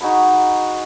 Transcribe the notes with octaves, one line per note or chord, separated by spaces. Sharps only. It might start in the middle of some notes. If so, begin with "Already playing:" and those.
D#4 F#4 G#4 B5